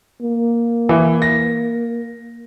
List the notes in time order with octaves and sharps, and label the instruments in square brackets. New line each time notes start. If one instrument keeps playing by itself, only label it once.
[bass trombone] A#3
[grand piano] E3
A#6